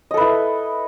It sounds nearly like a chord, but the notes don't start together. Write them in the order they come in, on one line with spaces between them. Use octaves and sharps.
D#5 A4 B4 E4